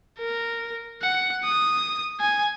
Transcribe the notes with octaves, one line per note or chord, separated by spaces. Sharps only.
A#4
F#5
D#6
G#5